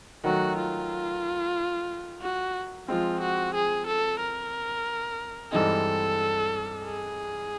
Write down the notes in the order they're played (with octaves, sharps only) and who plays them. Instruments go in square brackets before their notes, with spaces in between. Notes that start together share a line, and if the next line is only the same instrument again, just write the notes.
[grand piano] D#3 F#3 A3 [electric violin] F#4
[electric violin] F4
F#4
[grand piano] F3 G#3 C4 [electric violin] F4
[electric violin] F#4
G#4
A4
A#4
[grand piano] G2 E3 G#3 C4 D#4 [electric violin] A4
[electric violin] G#4